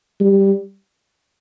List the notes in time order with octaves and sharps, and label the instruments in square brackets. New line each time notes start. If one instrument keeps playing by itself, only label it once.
[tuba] G3